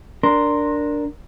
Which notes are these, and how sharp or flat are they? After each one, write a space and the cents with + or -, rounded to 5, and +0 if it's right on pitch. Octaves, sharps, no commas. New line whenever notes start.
D4 +0 A#4 +0 C6 +0